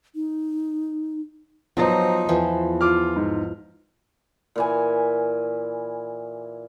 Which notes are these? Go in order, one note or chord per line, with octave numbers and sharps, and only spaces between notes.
D#4
F3 F#3 B3 D#4 C5
E2 E3 F3
F4 D6 F6
G#2
A#2 E3 G#5